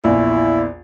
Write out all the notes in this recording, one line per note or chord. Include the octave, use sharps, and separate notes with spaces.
A#1 E2 E4